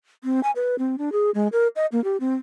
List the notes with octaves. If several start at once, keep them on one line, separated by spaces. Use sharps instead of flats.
C4
G#5
B4
C4
D4
G#4
G#3
A#4
D#5
A#3
G4
C4